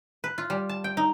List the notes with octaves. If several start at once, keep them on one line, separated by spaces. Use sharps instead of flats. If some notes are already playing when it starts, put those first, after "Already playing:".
B4
F4
G3
A5
G5
D#4